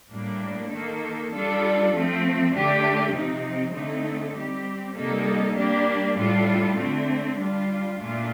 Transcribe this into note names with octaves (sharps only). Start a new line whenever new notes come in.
A2 G3 A#3 D4
D#3 A#3 D#4 A4
G3 D4 F4 A4
F3 A3 C4
D3 A3 D4 G4
C3 F3 C4 D#4
D3 A3 C4 D#4 A4
G3 C4 G4
C3 G3 A#3 D#4 A4
G3 A#3 D4 G4
A2 G3 D4 F4 A4
D3 A3 C4
G3 D4 F4
A#2 A3 D4 F4